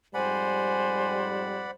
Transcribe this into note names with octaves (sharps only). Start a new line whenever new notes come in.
F2 G#2 G3 C5 D5 F#5 G#5 B5